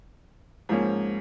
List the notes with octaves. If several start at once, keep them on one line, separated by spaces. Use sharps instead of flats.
G#2 F3 A#3 C#4